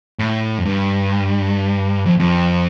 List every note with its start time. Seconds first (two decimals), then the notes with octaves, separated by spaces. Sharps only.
0.19 A2
0.58 F2
0.65 G2
2.06 F2
2.19 F2